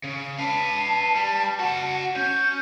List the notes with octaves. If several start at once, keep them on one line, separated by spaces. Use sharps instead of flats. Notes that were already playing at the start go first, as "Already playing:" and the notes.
C#3
B4 F5 A5
G3
F#4 F#5 A5
C#4 G6